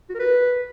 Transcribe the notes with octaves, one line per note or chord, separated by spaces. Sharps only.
F#4
A#4
B4